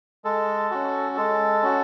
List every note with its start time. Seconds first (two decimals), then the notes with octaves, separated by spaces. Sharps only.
0.24 G#3 A4
0.70 C#4 F#4
1.17 G#3 A4
1.63 C#4 F#4